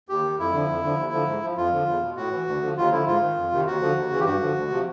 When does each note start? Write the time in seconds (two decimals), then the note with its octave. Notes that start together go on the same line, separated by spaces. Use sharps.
0.09 D#2 G4
0.23 D#3
0.39 F2 E4
0.53 D3 F3
0.68 F2
0.82 D3 F3
0.98 D#2
1.12 D3 F3
1.28 G#2
1.42 F3
1.57 F2 F4
1.72 D3 F3
1.87 E2
2.02 B2
2.17 A2 F#4
2.31 E3
2.47 D2
2.62 D3 F3
2.77 D#2 F4
2.91 D3 F3 E4
3.07 G#2 F4
3.22 D#3
3.37 F2
3.52 C3 D#3
3.66 D#2 F#4
3.81 D3 F3
3.96 D#2
4.10 C#3 E3
4.20 G4
4.25 G2 F#4
4.41 D3 F3
4.56 D2
4.70 C3 F3